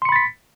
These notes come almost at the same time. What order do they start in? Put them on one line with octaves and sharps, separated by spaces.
C6 C#7 B5 A6 B6